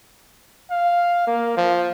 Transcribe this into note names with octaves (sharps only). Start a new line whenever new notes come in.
F5
A#3
F3